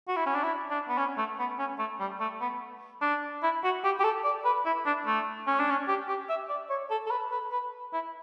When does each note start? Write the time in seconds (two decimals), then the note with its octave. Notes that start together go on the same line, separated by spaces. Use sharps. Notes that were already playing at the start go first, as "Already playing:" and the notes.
0.08 F#4
0.16 E4
0.26 C#4
0.35 D4
0.43 E4
0.70 D4
0.89 B3
0.98 C#4
1.18 A3
1.39 B3
1.59 C#4
1.79 A3
2.00 G3
2.20 A3
2.41 B3
3.02 D4
3.43 E4
3.64 F#4
3.84 G4
4.00 G4
4.04 A4
4.24 D5
4.45 B4
4.66 E4
4.86 D4
5.06 A3
5.47 C#4
5.59 D4
5.70 C#4
5.88 G4
6.08 G4
6.29 E5
6.49 D5
6.70 C#5
6.90 A4
7.06 A4
7.11 B4
7.31 B4
7.52 B4
7.93 E4